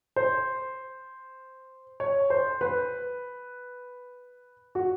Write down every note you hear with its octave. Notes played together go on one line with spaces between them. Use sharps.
C5
C#5
C5
B4
F#4